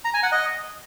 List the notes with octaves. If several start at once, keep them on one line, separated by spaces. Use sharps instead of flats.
A#5
G#5
F#5
D#5